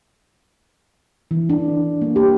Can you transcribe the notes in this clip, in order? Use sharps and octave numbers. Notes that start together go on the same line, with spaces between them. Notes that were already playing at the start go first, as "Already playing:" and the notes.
E3
D4
A#3
G4